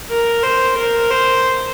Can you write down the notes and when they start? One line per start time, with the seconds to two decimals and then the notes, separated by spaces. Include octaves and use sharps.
0.10 A#4
0.43 C5
0.78 A#4
1.11 C5